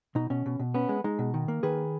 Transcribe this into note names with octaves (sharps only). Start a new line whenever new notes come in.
B2 D#4
B2 C#4
B2
B2
B3 C#4
G#3
G#3 D#4
B2
D#3
A#3
D#3 G#4 B4